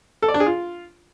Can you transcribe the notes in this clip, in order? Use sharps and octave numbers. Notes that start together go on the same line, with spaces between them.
A4
D5
D4
G#4
F4